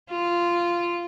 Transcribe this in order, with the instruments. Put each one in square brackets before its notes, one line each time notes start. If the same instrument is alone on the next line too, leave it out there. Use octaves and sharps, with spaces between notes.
[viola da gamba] F4